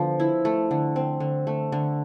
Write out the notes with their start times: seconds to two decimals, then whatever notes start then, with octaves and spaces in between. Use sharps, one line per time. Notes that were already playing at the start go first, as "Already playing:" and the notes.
Already playing: D3 F3 B3
0.20 E4
0.45 A3
0.71 D3
0.96 C4
1.20 D3
1.47 A3
1.72 D3